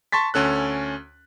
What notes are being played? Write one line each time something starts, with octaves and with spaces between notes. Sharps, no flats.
A5 C6 C#6 A6 B6
D2 C#4 A4 F#6